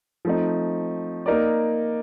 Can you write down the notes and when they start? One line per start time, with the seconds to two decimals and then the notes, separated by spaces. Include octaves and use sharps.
0.25 F3 A3 C4 D#4
1.26 A#3 D#4 A#4 D5